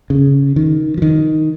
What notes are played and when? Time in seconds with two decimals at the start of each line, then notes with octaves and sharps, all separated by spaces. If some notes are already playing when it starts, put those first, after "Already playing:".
0.10 C#3
0.56 D#3
0.98 F3
1.02 D#3